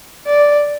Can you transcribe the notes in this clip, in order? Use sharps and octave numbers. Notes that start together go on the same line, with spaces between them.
D5